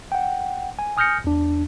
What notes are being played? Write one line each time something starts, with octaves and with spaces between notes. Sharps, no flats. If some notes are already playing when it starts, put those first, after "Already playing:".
F#5 G5
G#5
G#5 D#6 F6 G6 A#6 C#7
E2 D4